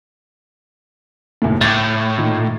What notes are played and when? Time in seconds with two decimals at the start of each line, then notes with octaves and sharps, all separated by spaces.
1.42 F#1 D#2 A2
1.61 A2 D6 G#6 A6
2.18 A#2 D#3